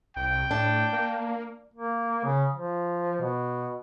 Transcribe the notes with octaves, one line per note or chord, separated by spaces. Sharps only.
C2 G5
A2 D4
A#3
A#3
C#3
F3
B2